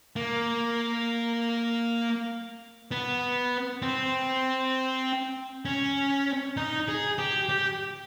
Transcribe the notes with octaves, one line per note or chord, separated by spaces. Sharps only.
A#3
B3
C4
C#4
D#4
G#4
G4
G4